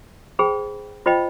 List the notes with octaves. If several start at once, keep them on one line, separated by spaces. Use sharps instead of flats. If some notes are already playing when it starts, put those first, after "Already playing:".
G#4 C5 G5 B5
F4 C5 D#5 G5 B5